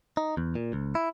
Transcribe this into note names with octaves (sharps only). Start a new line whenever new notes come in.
D#4
E2
A#2
C#2
E4